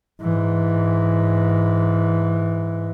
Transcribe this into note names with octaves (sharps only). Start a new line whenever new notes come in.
G#2 E3